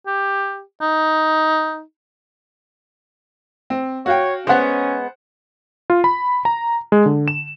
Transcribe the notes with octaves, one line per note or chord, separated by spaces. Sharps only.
G4
D#4
C4
F#4 C#5 F5 G5
G#3 B3 C#4 C5 F#5
F4
B5
A#5
G#3
D3
E7